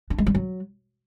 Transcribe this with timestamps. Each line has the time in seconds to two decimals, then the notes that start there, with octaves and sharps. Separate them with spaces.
0.10 D4
0.18 G#3
0.26 G3
0.35 F#3